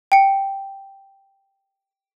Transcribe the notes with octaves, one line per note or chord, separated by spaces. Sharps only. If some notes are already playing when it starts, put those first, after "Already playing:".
G5 C#7